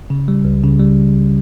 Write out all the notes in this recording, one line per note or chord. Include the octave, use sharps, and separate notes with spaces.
C#3
G3
C#2
C#3
G3